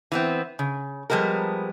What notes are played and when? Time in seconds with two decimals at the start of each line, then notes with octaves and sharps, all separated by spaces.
0.12 E3 B3 C4
0.59 C#3
1.10 F3 G3 G#3 B3 A#4